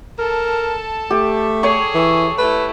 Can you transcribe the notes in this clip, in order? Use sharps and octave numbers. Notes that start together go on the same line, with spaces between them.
A4 A#4 A5
A3 G4
G#4 A4 C#5 C#6
E3
A3 E4 B4